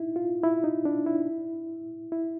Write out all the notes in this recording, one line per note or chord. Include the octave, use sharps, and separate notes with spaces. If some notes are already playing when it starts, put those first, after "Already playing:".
Already playing: D#4 E4
F4
E4
D#4
D4
E4
E4